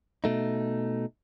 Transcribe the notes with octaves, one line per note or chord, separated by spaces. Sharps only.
B2 A3 D#4